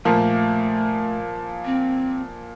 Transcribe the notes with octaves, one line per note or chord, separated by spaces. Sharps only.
A#2 F3 A3 A#3
C4